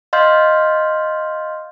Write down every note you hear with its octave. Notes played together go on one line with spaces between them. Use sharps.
D#5 F5 C6 F6 G6